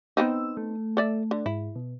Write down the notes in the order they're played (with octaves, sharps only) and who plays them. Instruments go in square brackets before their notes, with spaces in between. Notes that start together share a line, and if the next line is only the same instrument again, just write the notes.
[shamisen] B3 C4 D#4 [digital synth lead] E6
[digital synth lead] A3
[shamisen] A4 D5 E5
D3
[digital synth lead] G#2 [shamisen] E4
[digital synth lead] B2